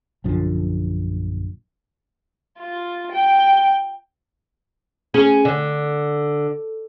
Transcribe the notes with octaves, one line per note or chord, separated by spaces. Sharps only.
A#1 F#2 D3 F3
F4
G5
C#4 G#4
D3